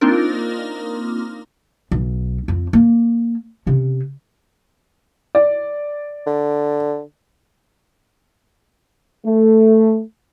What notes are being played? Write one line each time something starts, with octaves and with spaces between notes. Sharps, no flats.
A#3 C4 D4 D#4 F4 A#4
B1
F2 C4
A#3
C3 C#4
D5
D3
A3